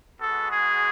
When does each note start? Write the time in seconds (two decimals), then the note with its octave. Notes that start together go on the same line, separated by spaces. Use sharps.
0.19 G#3 B3 F#4 A4
0.51 G#4